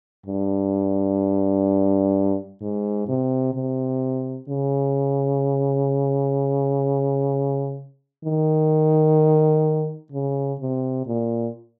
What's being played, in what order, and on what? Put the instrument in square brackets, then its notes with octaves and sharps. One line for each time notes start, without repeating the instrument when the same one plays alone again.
[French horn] G2
G#2
C3
C3
C#3
D#3
C#3
C3
A#2